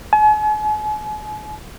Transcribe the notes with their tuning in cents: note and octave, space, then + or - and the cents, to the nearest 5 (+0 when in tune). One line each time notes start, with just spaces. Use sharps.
G#5 +40